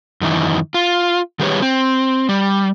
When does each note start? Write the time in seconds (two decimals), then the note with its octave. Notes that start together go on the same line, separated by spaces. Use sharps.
0.21 F#2 D#3 E3
0.74 F4
1.39 D#3 G3 G4 G#4 B4 C#5
1.62 C4
2.29 G3